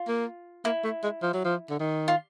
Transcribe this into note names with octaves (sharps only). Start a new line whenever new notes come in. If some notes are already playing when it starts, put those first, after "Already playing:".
Already playing: F4
A#3
A#3 E4
A3
G#3
F3
F#3
F3
D3
D#3
F4